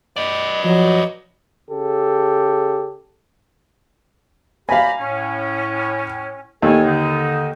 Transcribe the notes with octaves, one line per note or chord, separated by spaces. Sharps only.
B4 D5 D#5
F3 F#3 D#5
C#3 G4 A4
G4 F5 G#5 A#5 B5
A2 C#4
D#2 A4 C#5 G#5
D3 D#4